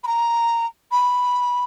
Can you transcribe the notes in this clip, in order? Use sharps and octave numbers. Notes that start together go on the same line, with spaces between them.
B5
A#5
B5